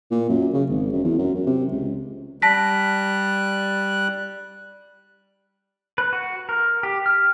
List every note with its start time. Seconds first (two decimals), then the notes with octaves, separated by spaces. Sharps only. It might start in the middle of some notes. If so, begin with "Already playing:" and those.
0.11 A#2
0.30 F#2
0.53 C#3
0.69 G#1
0.92 F#2
1.04 E2
1.19 F#2
1.35 F#2
1.47 C3
1.71 C#2
2.42 G3 A5 F#6 A#6 B6
5.98 B4
6.13 F#4
6.49 A#4
6.83 G4
7.06 F6